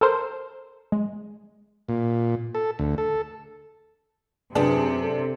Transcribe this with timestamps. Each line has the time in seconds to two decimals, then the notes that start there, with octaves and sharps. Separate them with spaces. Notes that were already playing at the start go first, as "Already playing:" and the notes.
0.01 A4 A#4 C5
0.92 G#3
1.89 A#2
2.55 A4
2.79 D2
2.98 A4
4.55 F#2 C3 B3 D4 G#4
5.02 A4